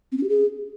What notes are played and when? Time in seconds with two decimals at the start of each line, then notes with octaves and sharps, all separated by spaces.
0.12 C4
0.18 C#4
0.23 G4
0.29 G#4